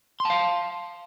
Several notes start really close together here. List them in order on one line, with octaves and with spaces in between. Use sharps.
C6 A5 F5